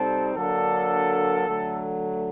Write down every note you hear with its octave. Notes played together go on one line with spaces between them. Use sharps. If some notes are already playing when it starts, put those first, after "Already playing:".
Already playing: C3 G3 C4 D#4 A4
D3 F#3 A#3 D4 A4
D3 F#3 A3